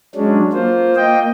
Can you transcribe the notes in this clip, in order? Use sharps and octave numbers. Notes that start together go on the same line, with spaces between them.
F#3 G#3 C#4 D4
A#3 F4 C5
A#3 D#5 G5